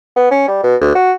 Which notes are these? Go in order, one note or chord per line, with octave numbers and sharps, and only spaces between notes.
B3
C#4
G3
B2
D2
F#4